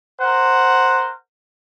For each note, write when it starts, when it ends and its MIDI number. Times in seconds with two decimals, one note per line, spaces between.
0.21 1.11 70
0.21 1.11 72
0.21 1.11 78